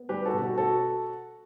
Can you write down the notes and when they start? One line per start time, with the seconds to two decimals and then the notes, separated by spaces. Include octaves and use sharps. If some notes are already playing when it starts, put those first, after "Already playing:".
Already playing: B3
0.09 G3 G4 B4
0.25 F#4 A4
0.33 B2
0.41 F#4 A4
0.58 F#4 A4